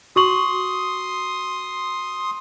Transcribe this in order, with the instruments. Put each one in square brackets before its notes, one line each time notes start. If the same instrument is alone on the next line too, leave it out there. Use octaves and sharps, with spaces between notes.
[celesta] F#4 C#6 F#7 [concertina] C6 D#6